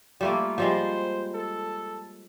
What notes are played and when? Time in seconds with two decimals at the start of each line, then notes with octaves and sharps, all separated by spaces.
0.21 G3 A3 A#3 F4
0.58 F3 G3 G#3 C5
1.34 A4